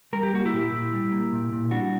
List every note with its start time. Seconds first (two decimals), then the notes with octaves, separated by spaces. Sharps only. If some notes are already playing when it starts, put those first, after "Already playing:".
0.13 G3 A#4
0.23 G4
0.33 A#3 F#4
0.45 E4 G4
0.53 A#2
0.72 A#2
0.92 G3
1.12 A#3
1.32 A#2
1.52 A#2
1.71 G3 D4 F#4